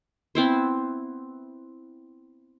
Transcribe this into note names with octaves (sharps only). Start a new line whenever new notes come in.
B3 C4 E4 C5